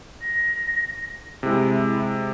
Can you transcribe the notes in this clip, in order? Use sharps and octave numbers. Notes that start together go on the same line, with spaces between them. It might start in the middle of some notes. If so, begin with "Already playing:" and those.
A#6
C3 G#3 E4